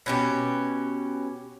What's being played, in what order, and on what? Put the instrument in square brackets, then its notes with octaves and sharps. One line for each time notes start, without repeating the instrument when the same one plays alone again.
[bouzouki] B2 C#4 G4